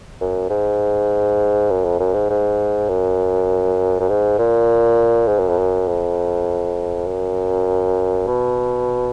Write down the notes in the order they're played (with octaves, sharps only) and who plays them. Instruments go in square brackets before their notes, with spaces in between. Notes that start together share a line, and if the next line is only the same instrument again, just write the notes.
[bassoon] F#2
G#2
F#2
F2
F#2
G#2
G#2
F#2
F#2
G#2
A#2
G#2
F#2
F2
F#2
F2
F#2
B2